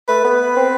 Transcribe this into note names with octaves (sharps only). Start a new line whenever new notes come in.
A3 B4
B3 B4
C4